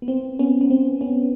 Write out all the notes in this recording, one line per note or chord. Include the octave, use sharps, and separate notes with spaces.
B3
C4
B3 C#4
B3
C4
B3 C#4